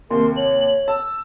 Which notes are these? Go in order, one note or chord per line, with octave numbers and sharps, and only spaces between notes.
D#2 C3 A#4 C6
C#5 F#7
A5 E6